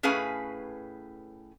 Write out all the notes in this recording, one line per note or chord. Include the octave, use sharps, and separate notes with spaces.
A2 C#4 G#4 B4 F5 G#5